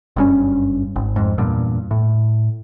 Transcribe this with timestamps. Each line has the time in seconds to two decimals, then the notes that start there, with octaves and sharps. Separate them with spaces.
0.16 F#1 G2 C#4
0.96 G#1
1.16 F2 G#2
1.38 E2 G2 A#2
1.91 A2